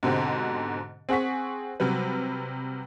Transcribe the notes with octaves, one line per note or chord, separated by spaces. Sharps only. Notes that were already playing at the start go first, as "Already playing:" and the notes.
G#2 B2 D3 C4 G4
C4 G#4 F#5 C#6 B6
C3 F#3 G3 B4